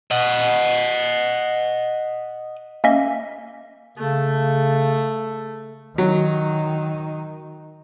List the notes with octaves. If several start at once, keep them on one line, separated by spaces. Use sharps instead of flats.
D#5 F#5
A#3 C#4 D#5 E5
C#3 A3
D#3 F#3